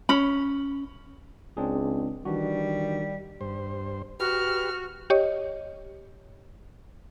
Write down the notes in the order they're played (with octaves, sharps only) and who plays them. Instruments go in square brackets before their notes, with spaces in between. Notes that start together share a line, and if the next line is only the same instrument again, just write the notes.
[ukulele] C#4 B5
[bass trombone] C#2 [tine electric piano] C4 D4 G#4
[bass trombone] D#3 [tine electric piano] E3 D4 F#4 [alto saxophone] G3
[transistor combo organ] G2 C5
[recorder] F#4 [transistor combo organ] G4 B4 [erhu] F6
[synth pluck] G4 C#5 D#5